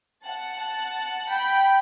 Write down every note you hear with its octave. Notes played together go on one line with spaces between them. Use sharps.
F#5 A5
F#5 A5
G5 B5